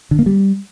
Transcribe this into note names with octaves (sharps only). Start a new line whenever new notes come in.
D3
A#3
G3